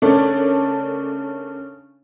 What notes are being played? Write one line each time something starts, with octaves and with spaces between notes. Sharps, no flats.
C#3 A3 A#3 D4 A4 C#5